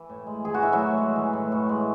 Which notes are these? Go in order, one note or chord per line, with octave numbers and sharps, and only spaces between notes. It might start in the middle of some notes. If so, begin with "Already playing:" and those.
Already playing: E3
A2
G#3
E3 G#4
F#4
A2 E4
F#3 F#4
A2
G#3
E3
A2
A2
G#3